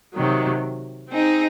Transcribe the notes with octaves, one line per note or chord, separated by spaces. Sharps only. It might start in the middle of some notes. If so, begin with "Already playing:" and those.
C3 D#3 F#3
C4 D#4 G#4